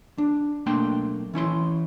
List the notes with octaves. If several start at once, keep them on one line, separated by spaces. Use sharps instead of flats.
D4
B1 A3 A#3 D4 G5 C6
E3 C#4 E4 C6